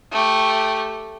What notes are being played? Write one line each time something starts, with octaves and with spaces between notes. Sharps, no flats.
A3 G4